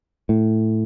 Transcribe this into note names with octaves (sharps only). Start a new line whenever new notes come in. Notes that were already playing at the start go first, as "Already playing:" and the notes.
A2